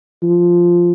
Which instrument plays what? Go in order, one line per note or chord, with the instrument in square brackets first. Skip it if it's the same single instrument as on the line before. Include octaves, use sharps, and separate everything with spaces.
[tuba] F3